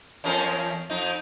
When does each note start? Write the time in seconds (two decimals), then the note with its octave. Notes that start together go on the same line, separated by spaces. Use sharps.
0.24 E2 C#4 A#4
0.90 F2 D#4